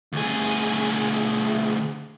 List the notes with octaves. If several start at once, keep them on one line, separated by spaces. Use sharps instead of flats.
D2 G#4